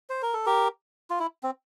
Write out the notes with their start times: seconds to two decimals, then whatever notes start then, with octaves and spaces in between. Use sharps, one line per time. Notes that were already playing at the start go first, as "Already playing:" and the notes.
0.10 C5
0.22 A#4
0.34 A4
0.46 G4 A#4
1.10 F4
1.19 E4
1.43 C4